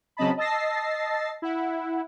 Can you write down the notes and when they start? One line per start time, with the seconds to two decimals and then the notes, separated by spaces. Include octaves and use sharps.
0.17 C#3 F#3 C4 D#5 A5 B5
0.37 D#5 A5 E6 A6 A#6 C7
1.42 E4 F#5